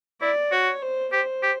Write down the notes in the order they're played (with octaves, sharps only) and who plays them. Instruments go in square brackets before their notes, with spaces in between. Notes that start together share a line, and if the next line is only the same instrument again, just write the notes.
[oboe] E4 [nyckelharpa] D5
[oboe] F#4 [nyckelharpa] C#5
[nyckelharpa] C5
[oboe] G4 [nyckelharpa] C5
[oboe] G4